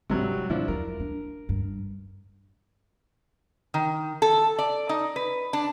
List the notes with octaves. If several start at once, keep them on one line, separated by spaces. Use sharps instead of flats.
G#1 G2 C3 F#3 G3
B2 F3 D4 E4
F2 F#3 A#4
D4
G2
D#3
A4
D5
D#4
B4
D4